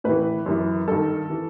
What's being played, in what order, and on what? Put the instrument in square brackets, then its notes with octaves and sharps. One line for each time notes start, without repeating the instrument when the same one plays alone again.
[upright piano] A2 E3 B4
F#2 E3
G2 D#3 A4
E3